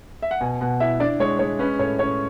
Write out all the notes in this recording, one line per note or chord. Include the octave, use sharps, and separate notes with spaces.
E5
F#5
B2 G#5
B2 F#5
E4 E5
D4 D5
G#3 C#5
G#3 C#5
C#4 B4
A2 C#5
C#4 C#5